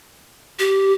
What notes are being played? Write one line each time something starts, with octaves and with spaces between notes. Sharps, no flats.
G4